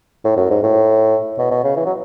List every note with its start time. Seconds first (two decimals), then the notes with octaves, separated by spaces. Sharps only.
0.24 A2
0.37 F#2
0.50 G#2
0.63 A2
1.38 B2
1.51 B2
1.64 C#3
1.77 E3
1.86 F#3